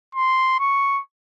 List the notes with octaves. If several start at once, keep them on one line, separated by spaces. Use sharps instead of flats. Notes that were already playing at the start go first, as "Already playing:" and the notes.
C6
C#6